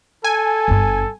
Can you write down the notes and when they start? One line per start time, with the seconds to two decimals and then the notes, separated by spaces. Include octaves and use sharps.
0.24 A4 G#5
0.68 G1 G2